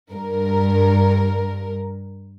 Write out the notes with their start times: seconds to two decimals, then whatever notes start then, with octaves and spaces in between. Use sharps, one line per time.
0.11 G2 A#4